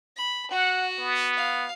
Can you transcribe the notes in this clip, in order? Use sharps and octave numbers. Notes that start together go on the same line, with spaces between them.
B5
F#4 F#5
B3
F5